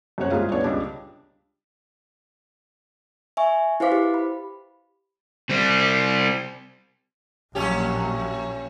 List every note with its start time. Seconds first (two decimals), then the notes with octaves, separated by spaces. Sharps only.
0.18 F#2 C3 F#4 C5 C#5 F#6
0.31 C2 G#2 F4 G#4 F5
0.52 D#1 B3 D4 C#5 D5
0.64 C#2 G3 G#3 D4 D6
3.37 E5 G#5 C#6
3.80 E4 B4 C5 F5 D6 B6
3.92 G4
4.14 B5
5.50 G3 C4
7.55 A#1 A2 F#3 C#4 G4